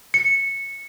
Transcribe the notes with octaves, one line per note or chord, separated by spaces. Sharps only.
C#7